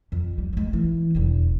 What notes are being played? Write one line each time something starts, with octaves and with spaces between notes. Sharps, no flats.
F2
G3
F#3 G#3
E3
E1 E2